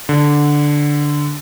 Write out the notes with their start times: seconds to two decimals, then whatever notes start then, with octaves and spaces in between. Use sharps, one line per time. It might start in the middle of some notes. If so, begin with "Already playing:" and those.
0.09 D3